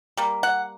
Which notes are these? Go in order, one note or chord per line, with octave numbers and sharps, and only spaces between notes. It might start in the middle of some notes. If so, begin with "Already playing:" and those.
G3 A#3
F#5